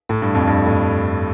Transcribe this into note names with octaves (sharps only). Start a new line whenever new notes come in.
A2
G2
F2
G2
A2